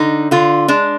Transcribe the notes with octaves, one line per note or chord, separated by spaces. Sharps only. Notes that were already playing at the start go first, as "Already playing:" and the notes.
Already playing: D3 D#4
D3 F4
G#3 D4